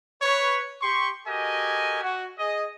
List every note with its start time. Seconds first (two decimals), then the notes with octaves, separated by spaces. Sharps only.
0.22 B4 C#5
0.82 G4 C6 C#6
1.27 F#4 G4 A4 A#4 D#5 G#5
2.03 F#4
2.39 G#4 D#5